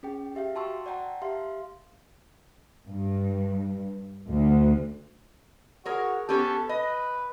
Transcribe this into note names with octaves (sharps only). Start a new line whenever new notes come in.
C#4 G#4 G5
G4 E5 F5 G5
F#4 A5 C6 C#6 E6
D5 F#5 G5 A5 A#5
G4 E5 F5 C6
G2
D2
F#4 G#4 A#4 C#5
B3 C#4 G4 A4
B4 D#5